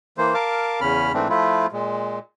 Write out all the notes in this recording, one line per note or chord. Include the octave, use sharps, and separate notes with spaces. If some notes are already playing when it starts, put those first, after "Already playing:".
E3 A#3 C5
A#4 F5 A5 D6
E2 C#3 C#4 B5 F6
G#2 E3 A3 C4 D4
F3 A3 E4 F4
A#2 G#3